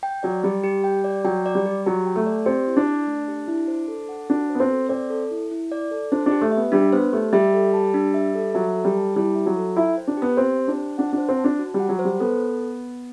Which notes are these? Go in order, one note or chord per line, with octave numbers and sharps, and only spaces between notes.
G5
F#3 D5
G3 G4
G4
G5
D5
F#3 G5
D5
G3
G4
F#3 G4
G5
A3
D5
C4 G4
E4
D4
D5
A3
G4
E4
C5
A4
F#5
D4 F#4
C5
B3
C4
A4
C4 D5
A4
E4
E4
D5
A4
D4 C5
D4
G4
A3
E5
B3
G3 D4
B3 C5
A3 G4
G3 E5
A4
A5
D4
E5
A4
F#3 E5
A4
G3
A5
G3 E4
E5
F#3
A4
E4 G5
C5
D4
B3 G4
C4 G4
G5
D4
C5
D4 F#5
D4
C5
C4
A5
D4
F#4
G3
F#5
F#3
C5
G3
B3 A4